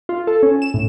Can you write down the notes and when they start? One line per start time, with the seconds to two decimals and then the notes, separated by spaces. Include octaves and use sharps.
0.09 F4
0.27 A4
0.43 C#4
0.62 E7
0.74 A2